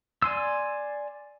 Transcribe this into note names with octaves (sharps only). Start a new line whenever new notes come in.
D5 G#5 C6 E6